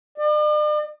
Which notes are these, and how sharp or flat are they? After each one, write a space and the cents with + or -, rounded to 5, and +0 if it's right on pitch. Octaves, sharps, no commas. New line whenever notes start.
D5 +45